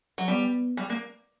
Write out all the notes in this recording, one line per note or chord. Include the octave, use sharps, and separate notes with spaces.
F#3
G3 B3
G3
A#3